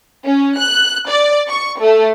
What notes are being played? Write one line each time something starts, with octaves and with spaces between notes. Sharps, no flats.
C#4
F#6
D5
C#6
A3